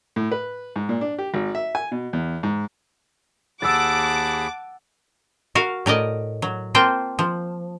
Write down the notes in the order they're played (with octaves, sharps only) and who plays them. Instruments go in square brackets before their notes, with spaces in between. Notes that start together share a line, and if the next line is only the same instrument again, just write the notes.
[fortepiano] A2
B4
G#2
A#2
D4
G4
G#1
E5
G#5
B2
E2
G#2
[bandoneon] D#2 G#4 B5 [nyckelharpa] F#5 A5 [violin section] D6 [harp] E6 A6
[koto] F#4 A#4 F5
A2 A#4 D5 D#5
F#3
A#3 C4 F4 G5 A5
F3